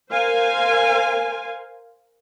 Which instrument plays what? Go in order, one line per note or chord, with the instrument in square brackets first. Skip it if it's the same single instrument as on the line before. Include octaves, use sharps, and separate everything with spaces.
[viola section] A#4 C5 F5 G#5